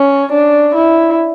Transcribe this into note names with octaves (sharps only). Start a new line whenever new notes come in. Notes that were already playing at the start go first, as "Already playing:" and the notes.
Already playing: C#4
D4
E4